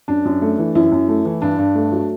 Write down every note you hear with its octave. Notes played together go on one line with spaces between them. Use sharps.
F#2 D4
F#2
A3
E3
F#2 E4
F#2
A3
E3
G2 D4
G2
A3
F#3